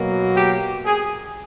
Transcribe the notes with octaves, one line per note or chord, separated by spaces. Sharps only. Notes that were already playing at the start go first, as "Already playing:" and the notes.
Already playing: B2 F#3 A#3
G4
G#4